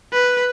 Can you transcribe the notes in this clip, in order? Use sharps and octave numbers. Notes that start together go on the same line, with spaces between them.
B4